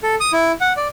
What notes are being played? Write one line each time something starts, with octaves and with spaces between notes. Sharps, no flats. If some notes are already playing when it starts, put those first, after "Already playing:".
A4
D#6
E4
F#5
D5